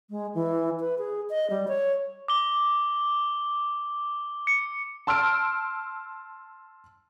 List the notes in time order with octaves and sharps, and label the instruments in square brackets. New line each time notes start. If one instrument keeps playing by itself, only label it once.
[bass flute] G#3
E3
B4
G#4
D#5
G3
C#5
[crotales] D6 G7
C#7
[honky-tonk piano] A5 C6 E6 F6 D7